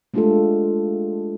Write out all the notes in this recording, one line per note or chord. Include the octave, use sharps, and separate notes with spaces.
G#3 A3 D4 F4 G4 A4